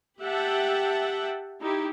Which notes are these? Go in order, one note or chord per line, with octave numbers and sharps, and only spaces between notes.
G4 E5 F#5 G5 A5
D#4 E4 G4